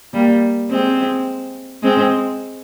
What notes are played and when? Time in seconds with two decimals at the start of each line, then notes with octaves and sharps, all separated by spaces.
0.13 G3 A#3
0.70 G#3 C4
1.83 G#3 C4